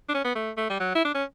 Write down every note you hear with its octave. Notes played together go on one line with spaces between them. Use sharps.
D4
C#4
B3
A3
A3
G3
F#3
E4
D4
C#4